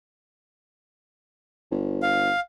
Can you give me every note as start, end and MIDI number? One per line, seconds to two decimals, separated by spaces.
1.71 2.31 31
2.02 2.40 77